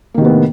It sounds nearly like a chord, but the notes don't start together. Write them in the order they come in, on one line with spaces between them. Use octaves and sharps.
A#3 D#3 C3 B3 A2